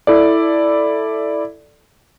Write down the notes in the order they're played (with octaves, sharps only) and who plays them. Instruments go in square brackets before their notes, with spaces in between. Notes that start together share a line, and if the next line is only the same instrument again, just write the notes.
[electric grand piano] E4 A4 D5